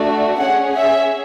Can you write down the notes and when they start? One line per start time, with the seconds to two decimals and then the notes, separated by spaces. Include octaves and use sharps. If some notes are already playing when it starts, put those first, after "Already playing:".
Already playing: A3 D4 F#4
0.39 C#4 G#4 F#5
0.78 E5